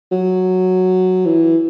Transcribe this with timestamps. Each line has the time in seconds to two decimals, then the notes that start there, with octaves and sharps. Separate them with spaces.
0.12 F#3
1.25 E3